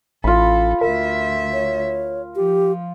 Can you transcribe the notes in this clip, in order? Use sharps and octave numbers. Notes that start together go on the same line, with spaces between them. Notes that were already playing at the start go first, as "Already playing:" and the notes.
A1 F4 A4 B5
D2 A#4 E5
C#5
F3 G4